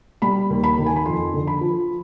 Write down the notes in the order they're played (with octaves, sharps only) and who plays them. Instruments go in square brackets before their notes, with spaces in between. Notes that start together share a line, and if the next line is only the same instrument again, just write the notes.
[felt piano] G3 B5
D#2
B5
D#3
G#5
B5
F2 C6
D3
B5
F3